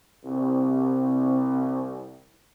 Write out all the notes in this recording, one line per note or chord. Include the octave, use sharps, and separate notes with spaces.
C2 C3